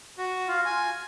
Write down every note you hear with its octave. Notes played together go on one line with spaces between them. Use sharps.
F#4
F4
G#5